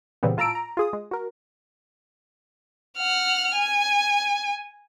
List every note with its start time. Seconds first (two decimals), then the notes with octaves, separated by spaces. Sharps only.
0.23 A#2 C#3 E3 G3 B3 C4
0.37 A2 F4 A5 A#5 E6 D7
0.55 A#5
0.77 F4 G#4 D#6
0.93 G#3
1.11 F#4 A#4
2.98 F#5 F6
3.54 G#5